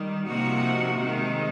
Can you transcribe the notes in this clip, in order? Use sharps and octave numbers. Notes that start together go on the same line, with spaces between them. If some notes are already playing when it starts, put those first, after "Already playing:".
Already playing: D#3 G3
C3 F3 A#3 D#4 F#4
C3 D#3 G#3 C4